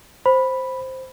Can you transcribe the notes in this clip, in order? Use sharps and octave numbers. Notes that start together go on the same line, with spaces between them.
C5 B5